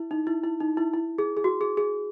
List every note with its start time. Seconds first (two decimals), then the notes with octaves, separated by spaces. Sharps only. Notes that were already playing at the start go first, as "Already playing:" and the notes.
Already playing: E4
0.11 D#4
0.27 E4
0.44 E4
0.60 D#4
0.77 E4
0.93 E4
1.18 G#4
1.37 G#4
1.44 F#4
1.61 G#4
1.77 G#4